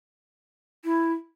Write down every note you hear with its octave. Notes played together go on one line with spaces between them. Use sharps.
E4